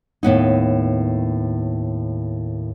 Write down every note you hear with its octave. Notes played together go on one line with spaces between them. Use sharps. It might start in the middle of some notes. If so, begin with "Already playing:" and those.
D#2 A2 B3 D#4